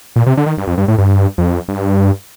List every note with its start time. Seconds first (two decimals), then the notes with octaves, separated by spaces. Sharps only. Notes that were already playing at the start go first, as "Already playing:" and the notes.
0.16 A#2
0.26 C3
0.37 D3
0.46 D#3
0.58 G2
0.67 F2
0.78 G2
0.88 A2
0.98 G2
1.38 F2
1.69 G2